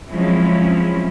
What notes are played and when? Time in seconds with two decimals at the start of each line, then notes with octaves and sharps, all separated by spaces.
0.12 F3 F#3 G#3 C4 C#4 E4